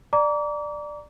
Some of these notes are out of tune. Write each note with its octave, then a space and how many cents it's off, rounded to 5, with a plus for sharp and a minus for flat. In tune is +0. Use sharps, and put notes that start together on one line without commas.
D5 +10 A#5 +0 D6 -35